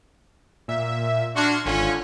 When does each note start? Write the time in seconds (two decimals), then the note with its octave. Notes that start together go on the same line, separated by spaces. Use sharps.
0.68 A#2 E5
1.36 D4 F#4 C6 F6 G#6
1.66 G#1 D3 C#4 F4